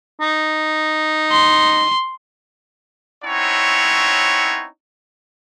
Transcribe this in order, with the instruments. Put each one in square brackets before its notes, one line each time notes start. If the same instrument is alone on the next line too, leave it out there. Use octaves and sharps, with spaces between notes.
[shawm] D#4
[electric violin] C6
[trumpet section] C4 C#4 D#4 E4 C#5 F#5